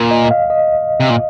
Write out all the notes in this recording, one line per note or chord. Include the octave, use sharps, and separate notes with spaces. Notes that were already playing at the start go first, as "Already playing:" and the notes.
Already playing: A#2
D#5
F5
D#5
C3
A#2